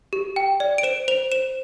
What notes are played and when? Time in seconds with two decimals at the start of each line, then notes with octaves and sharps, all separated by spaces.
0.13 G4
0.36 G5
0.60 D5
0.78 D7
0.83 C5 E7
1.08 C5 F7
1.32 C5 E7